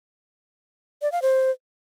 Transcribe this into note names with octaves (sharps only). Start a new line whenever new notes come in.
D5
F5
C5